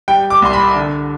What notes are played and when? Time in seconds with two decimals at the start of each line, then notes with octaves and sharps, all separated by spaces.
0.08 G3 G5
0.30 D6
0.42 C2 C6
0.53 B5
0.75 D3